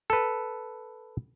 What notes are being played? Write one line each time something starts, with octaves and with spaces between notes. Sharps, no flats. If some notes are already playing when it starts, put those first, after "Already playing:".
A4 B4